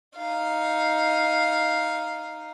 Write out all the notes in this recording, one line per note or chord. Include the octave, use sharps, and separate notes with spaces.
D#4 F5